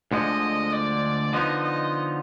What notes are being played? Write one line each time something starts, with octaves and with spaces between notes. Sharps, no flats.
D2 D3 F3 G#3 D#5
D5
D3 F3 B3 D#4 D#5
D#5